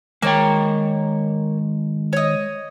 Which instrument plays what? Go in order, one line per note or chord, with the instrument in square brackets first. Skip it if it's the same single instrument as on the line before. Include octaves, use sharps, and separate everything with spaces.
[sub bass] D#3 [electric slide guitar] G#3 G5 [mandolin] A#3 C#5
[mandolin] C#5 D#5